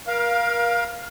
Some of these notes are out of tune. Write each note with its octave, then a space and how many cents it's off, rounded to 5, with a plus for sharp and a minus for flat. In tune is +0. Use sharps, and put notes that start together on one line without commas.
A#4 +30 F5 +0